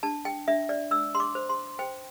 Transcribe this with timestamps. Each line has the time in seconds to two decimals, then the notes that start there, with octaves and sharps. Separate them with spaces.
0.03 D4 A5
0.25 G5
0.48 D4 E5
0.69 D5
0.91 D4 E6
1.15 C6
1.20 D6
1.35 C5
1.49 C6
1.79 C5 G5